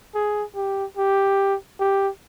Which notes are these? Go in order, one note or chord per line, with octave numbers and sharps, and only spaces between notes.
G#4
G4
G4
G4